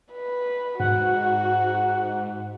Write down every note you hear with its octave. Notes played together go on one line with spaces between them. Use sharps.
B4
G#2 F#4 F#5